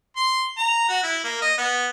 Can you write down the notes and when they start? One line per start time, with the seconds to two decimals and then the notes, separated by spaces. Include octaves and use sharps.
0.16 C6
0.58 A#5
0.89 F#4
1.03 E4
1.24 A#3
1.42 D#5
1.58 B3